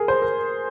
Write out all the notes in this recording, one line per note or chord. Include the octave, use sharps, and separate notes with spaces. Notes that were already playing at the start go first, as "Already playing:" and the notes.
Already playing: G#4 A#4
C5
A#4